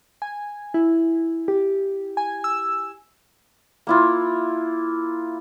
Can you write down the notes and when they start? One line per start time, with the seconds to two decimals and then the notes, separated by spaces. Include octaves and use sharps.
0.22 G#5
0.74 E4
1.48 G4
2.17 G#5
2.44 E6
3.87 A#3 E4 F4